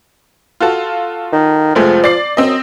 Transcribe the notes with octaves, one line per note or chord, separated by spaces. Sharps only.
F4 F#4 A4
D#3
F1 F3 G#3 A3
D5 A6 C7
F#2 C4 D#5